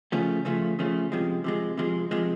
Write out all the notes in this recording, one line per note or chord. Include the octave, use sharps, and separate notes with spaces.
C#3 F3 A3 C#4
C#3 F3 A3 C#4
C#3 F3 A3 C#4
C3 F3 G#3
C3 F3 G#3
C3 F3 G#3
C3 F3 G#3